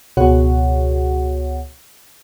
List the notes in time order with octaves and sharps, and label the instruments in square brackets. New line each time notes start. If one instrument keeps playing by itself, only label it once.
[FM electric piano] C#2 B2 F#4 G#4 C#5 F#5